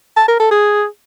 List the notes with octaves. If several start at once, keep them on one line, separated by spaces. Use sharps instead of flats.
A5
A#4
A4
G#4